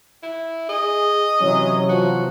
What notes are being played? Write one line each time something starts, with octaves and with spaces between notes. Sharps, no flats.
E4
G#4 D#5
C3 E3 F#3 C#4
F3 F#4